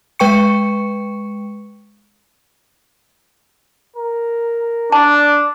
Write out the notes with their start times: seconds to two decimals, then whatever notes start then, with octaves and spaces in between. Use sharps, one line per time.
0.19 G#3 B4 G5 C#6 C#7
3.96 A#4
4.92 D4 D5 A5